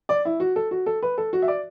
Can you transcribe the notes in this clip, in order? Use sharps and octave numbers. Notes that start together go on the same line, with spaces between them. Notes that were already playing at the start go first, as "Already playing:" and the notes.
D5
E4
F#4
A4
F#4
A4
B4
A4
F#4
E5
D5